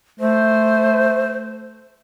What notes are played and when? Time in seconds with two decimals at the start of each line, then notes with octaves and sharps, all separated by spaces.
0.20 A3 C5